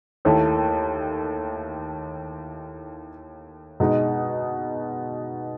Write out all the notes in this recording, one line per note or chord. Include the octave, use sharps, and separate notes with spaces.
D#2 D#3 A3 E4
B2 G#3 D#4